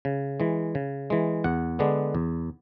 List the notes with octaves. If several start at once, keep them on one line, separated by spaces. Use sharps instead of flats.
C#3
E3 G#3
C#3
E3 G#3
E2 F#5
D3 G#3 B3 D4
E2